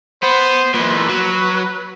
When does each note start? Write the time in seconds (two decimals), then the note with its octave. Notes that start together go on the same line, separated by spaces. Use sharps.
0.23 B3 C5
0.74 A#2 E3 B4
1.09 F#3